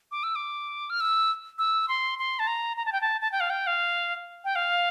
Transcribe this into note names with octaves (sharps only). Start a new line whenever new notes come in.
D6
E6
D6
F6
E6
E6
C6
C6
A5
A#5
A#5
A5
G5
A5
A5
G5
F5
G5
F5
G5
F5